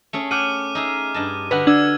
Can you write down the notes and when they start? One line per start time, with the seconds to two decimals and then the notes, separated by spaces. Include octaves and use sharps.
0.13 A3 C#4 G#4
0.31 F#5 G5 D6 F6 D#7
0.75 D#4 G#4 E5
1.14 G2 D#5 A5
1.51 D3 F#4 B4 D#5 F#5
1.67 D4 E6 G#6